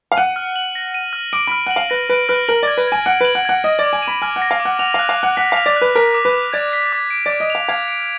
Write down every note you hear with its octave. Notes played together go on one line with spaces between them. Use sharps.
F5
F#5 D#7
F6
F#7
A#6
D#7
F6
D6 D7
B5 F6
F#5
F#7
F5
B4 A#6
B4 D7
B4 F6
A#4 F#7
D5 G#6
B4
G#5 G#6
F#5 D7
B4 F#7
F#5
F#5 G#6
D#5 A#6
D5 D6
G#5
D#7
B5
G#5 F6
F#5
A#6
F5
D6
F#5
F#5 F7
F5 F#6
F5
F#6
F#5
F#5 B6
F5
F7
D5
F#6
B4
A#4 B6
D6
B4
D6
D5 G#6
B6
D6
D7
D5 D6
D#5
F5 F7
F5 G#6
D7